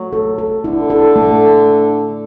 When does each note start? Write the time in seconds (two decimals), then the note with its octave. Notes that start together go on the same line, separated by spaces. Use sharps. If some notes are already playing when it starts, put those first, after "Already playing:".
Already playing: F#3 A3
0.13 A4
0.38 A4
0.64 D3 E4
0.90 A4
1.16 A3